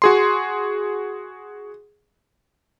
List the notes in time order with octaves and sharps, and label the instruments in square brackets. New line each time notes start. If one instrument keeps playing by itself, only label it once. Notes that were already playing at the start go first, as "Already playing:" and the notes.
[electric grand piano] F#4 G#4 C6